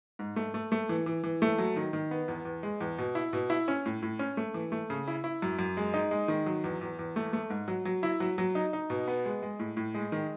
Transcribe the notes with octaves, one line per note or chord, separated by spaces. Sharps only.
G#2
A3
A3
A3
E3
E3
E3
A3
F#3
D#3
D#3
B3
E2
E2
G#3
E2
B2
E4
B2
E4
C#4
A2
A2
C#4
A3
E3
A3
C#3
E4
E4
F#2
F#2
G#3
D#4
G#3
D#3
F#3
E2
E2
E2
A3
A3
G#2
F#3
F#3
E4
F#3
F#3
D#4
D#4
B2
B3
G#3
G#3
A2
A2
G#3
D#3